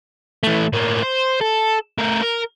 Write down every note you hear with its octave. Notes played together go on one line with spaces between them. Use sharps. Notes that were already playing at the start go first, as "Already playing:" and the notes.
E3 A3
A2 A#3
C5
A4
A3 A#4
A#4